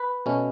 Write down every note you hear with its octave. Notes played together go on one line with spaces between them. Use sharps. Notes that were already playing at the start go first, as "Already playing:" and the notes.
Already playing: B4
B2 A3 C#4